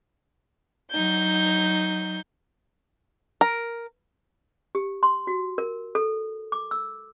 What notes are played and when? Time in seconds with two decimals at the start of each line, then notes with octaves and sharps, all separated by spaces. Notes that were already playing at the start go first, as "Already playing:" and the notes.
0.92 F#3 D#4 G6
3.41 A#4
4.75 G4
5.03 C6
5.27 F#4
5.58 A#4
5.95 A4
6.52 D6
6.71 E6